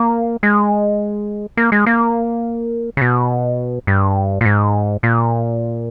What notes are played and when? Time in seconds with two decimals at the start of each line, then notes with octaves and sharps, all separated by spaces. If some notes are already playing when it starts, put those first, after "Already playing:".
Already playing: A#3
0.43 G#3
1.57 A#3
1.72 G#3
1.86 A#3
2.97 C#3
3.01 B2
3.87 G2
4.41 A#2
4.45 G#2
5.03 A#2